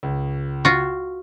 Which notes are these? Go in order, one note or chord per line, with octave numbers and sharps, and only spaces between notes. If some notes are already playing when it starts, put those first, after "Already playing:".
C#2
F4 F#4